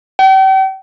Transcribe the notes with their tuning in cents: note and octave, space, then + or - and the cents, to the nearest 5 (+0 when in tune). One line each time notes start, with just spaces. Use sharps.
G5 -40